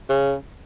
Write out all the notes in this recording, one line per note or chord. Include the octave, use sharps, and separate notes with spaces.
C#3